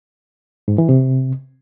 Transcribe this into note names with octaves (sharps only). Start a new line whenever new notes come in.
G#2
E3
C3